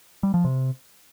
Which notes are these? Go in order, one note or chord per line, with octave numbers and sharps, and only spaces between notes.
G3
F3
C3